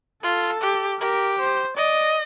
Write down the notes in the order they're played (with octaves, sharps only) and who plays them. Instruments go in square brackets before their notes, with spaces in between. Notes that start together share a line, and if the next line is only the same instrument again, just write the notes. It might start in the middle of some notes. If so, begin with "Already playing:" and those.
[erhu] F4 [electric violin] A4
[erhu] G4
[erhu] G4 [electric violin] A#4
[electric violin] C5
[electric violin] D5 [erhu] D#5